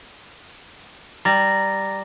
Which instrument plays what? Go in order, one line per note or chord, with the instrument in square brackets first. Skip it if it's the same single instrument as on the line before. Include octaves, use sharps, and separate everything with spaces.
[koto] G3 [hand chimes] A#5 A6 A#6